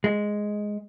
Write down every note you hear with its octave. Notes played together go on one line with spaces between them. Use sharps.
G#3